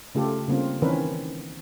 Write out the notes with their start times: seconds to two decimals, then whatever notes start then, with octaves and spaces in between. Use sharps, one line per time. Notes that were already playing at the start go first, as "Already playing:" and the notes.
0.15 C#3 A3 F4 G4 A4
0.48 C#3 G3 A#3 C4 F4
0.82 D#3 E3 C4 C#4 A#4 B4